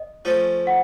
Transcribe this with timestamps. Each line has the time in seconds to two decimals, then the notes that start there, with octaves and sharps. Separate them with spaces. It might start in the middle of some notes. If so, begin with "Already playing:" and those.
Already playing: D#5
0.25 F3 A3 C#4
0.67 F#5